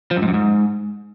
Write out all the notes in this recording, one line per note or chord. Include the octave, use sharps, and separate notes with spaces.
F3
F#2
G#2
F#2
G#2